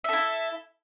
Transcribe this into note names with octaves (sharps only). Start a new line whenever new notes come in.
E4 A4 E5